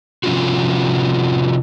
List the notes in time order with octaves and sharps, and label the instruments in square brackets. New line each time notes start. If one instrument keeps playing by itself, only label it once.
[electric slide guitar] C3 F3 G3 C#4 F4 F#4